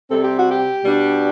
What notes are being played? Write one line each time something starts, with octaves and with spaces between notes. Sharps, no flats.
C3 G3 C4 A4
G4
F#4
G4
B2 G3 D4